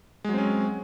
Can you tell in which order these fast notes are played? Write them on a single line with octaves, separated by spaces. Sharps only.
G#3 F#3 C4 C#4